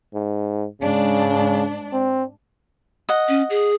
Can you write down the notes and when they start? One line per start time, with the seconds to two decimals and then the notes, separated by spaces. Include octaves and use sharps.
0.14 G#2
0.81 G#2 C#3 D4
1.93 C4
3.09 D#5 F#5
3.28 C#4
3.50 G#4